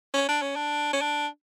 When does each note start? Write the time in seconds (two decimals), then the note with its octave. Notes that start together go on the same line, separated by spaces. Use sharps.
0.14 C#4
0.29 D4
0.42 C#4
0.56 D4
0.93 C#4
1.01 D4